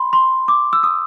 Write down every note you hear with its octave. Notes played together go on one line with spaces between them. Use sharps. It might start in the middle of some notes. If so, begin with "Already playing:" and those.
Already playing: B5 C6
C6
D6
E6
D#6